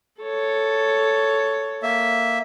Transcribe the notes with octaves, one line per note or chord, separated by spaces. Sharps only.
A4 C#5
A#3 E5